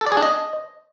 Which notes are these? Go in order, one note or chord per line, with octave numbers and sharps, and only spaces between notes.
A4
D5
G#4
D4
D#5